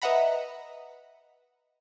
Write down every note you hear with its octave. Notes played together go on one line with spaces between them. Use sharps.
B4 D#5 E5 F#5 A#5 B5